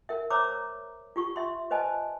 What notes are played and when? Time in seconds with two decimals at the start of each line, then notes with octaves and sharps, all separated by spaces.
0.09 A#4 E5
0.30 C5 C#5 A#5 D6 E6
1.16 F4 G4 C#6
1.36 E5 C6
1.71 B4 C5 D#5 G#5 A5